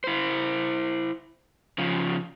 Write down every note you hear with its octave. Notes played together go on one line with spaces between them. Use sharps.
E4 C5
C#3 F3